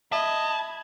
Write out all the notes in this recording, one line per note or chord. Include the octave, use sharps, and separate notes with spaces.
D#5 E5 A5 B5 G#6